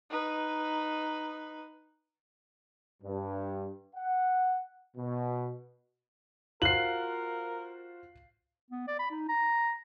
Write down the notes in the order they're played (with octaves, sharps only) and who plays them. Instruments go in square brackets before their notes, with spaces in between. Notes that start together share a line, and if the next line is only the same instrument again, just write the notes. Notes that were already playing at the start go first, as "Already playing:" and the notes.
[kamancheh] D#4 B4
[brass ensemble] G2
F#5
B2
[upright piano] F4 F#4 C5 [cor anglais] A#4 [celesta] F5 F#6 [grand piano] C7 F#7
[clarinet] B3
D5
B5
D#4
A#5